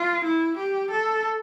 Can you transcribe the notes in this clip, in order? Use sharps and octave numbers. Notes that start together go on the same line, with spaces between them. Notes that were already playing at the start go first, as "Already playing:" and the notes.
Already playing: F4
E4
G4
A4